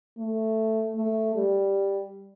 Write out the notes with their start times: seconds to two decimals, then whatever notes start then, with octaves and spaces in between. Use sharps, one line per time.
0.18 A3
0.95 A3
1.35 G3